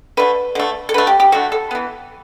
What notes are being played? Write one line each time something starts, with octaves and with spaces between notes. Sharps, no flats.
D3 A3 B4
D3 A3
A4
D3 A3 B4
G4
G4
D3 A3 F#4
A4
E3 B3